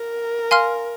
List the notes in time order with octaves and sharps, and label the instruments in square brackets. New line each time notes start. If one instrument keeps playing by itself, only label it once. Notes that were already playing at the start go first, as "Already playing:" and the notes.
Already playing: [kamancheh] A#4
[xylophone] F5 G#5 C6 F6